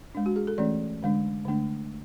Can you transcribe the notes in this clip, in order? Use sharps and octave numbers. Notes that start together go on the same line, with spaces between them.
G#3 D4
F#4
G#4
A4
E3 A3 C#4 D5
D3 G#3 D4
D3 A3 D4